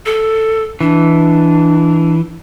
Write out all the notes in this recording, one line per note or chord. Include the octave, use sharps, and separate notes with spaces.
A4
E3 D4